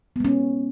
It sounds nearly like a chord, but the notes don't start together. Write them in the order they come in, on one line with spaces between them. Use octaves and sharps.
B3 G#3 C#4